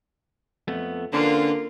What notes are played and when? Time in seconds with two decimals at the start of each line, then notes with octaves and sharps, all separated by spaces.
0.68 F2 A3 B3
1.13 D3 A#3 C#4 F4 B4 C5